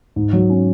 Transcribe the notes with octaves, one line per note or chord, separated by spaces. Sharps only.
G#2
F#3
C#4